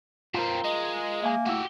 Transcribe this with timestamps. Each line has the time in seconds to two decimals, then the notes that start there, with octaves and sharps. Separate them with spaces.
0.34 A#2 C4 F4 A#4
0.64 G#3 D#5
1.23 A#3 E5 G#5
1.46 A3 E4 F#4 G4